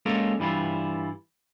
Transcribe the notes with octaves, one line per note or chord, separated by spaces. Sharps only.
G#3 A#3 C#4 F4 A4 A#4
G2 E3 G3 E4 F4